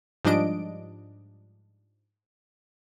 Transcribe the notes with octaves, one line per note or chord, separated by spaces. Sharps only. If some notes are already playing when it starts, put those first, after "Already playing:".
G#2 F3 G3 D4 D#5 D7